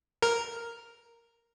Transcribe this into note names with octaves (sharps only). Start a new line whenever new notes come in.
A#4